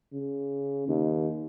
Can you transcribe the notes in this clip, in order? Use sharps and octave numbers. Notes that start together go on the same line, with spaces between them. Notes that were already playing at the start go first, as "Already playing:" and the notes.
C#3
D#2